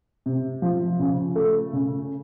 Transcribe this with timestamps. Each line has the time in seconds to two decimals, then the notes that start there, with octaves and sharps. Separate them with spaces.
0.26 C3
0.62 F3
0.99 C#3
1.35 A3
1.73 C#3